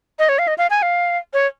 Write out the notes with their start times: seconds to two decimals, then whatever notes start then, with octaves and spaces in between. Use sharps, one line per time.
0.19 D#5
0.29 C#5
0.39 F5
0.48 D#5
0.58 F5
0.70 G#5
0.82 F5
1.33 C#5